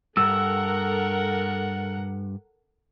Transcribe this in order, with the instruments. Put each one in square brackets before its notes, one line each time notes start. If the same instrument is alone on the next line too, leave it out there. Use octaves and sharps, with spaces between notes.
[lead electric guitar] G2 [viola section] A4 A#4 F#5 [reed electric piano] E6